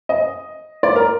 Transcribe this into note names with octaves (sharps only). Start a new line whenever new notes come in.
D#5
D5
A#4